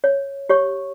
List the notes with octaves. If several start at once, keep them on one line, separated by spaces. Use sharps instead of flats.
C#5
G4 C#5 C#6